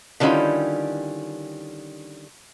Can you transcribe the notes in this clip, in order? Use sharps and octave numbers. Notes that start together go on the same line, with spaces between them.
D3 D#3 G3 C#4 E4 F4